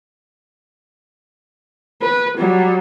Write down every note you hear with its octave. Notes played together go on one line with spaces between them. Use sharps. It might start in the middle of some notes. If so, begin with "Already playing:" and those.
B4
F#3 G3